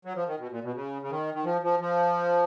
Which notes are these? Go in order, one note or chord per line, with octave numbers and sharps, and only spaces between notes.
F#3
F3
D#3
B2
A#2
B2
C#3
C#3
D#3
D#3
F3
F3
F3